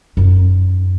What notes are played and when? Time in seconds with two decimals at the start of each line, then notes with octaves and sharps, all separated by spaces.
0.17 F#2 D#4